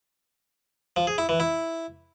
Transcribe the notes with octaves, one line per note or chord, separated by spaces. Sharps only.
F3
G#4
E4
E3
E4